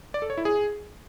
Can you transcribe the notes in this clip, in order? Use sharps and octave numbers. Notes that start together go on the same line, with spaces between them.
D5
A4
C#5
E4
G#4